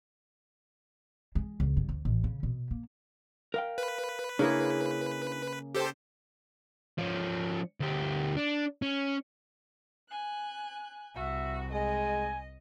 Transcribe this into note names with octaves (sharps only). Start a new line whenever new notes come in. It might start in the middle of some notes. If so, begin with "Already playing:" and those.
G#3
C#2
G2
D2
A1
C#3
B2
A#3
A#4 F5 G5
B4
C#3 A#3 D4 E4 G#4
G4 A4 C5
F3 C#4
D2 G4
D4
C#4
G#5 F#6
C2 F#4 E5
G#3 D#5 G#5